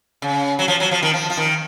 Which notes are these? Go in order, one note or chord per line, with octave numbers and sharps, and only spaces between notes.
C#3
F#3
F3
F#3
F3
D#3
F3
F3
D#3